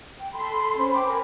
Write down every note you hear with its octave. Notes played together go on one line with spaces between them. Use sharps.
G5
A4 B5 C6
C#4 C5 B5
C5 G5 D6
A#4 G#5 B5